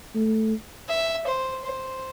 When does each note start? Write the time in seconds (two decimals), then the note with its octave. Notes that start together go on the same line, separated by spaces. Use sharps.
0.15 A3
0.89 E5
1.27 C5
1.64 C5